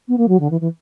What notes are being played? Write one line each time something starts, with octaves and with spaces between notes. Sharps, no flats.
B3
A#3
F#3
D3
E3
E3